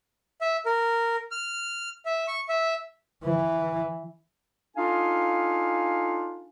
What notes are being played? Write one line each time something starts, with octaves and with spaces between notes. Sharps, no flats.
E5
A#4
F6
E5
C#6
E5
E3
D4 D#4 F4 A4 F5 G#5